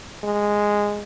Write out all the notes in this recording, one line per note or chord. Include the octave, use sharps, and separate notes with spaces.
G#3